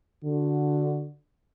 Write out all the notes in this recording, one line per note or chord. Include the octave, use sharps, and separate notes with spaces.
D3 F#4